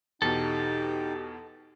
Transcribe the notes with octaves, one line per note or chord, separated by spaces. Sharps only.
E2 B2 D#4 G4 A4 G5